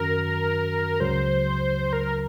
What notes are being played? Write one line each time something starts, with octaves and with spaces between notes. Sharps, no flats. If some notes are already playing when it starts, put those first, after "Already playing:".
Already playing: F#2 D#3 F#3 C#4 F#4 A#4
C#2 C#3 F#3 C5
A#4